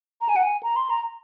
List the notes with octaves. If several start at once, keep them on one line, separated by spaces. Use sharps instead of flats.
A#5
G#5
F#5
G#5
A#5
C6
A#5